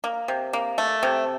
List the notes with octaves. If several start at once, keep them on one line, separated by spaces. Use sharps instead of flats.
A#3
C3
A#3
A3
C3